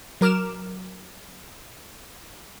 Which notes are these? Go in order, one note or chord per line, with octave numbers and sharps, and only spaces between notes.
F#3 A#4 D6 F6 E7